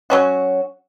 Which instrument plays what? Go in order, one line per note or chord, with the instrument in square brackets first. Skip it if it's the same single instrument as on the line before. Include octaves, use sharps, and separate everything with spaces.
[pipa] F#3 C#4 F#4